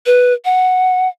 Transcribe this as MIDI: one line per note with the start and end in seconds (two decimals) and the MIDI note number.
0.06 0.33 71
0.45 1.09 78